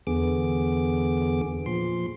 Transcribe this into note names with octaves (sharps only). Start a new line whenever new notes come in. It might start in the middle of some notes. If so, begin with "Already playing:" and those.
E2 D3 B3 G#4 D6
A#2 F3 C6